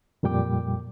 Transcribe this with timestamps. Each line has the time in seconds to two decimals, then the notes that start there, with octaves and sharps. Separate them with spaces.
0.23 F2 A#2 G3 G5 D6